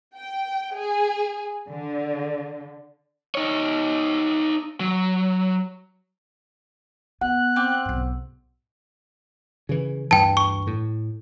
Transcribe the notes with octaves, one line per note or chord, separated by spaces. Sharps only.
G5
G#4
D3
D#4 C#5
F#3
B3 F#5 F#6
C4 D6 F6
B1 G#2
C#3 E3
D2 G2 E3 G5 A5
C#6
A2